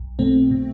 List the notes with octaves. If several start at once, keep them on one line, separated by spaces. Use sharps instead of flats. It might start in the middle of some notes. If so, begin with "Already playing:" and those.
Already playing: B1
B2 A3 C4
B2